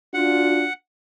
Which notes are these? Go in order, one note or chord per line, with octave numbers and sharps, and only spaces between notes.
D4 F4 F#4 F#5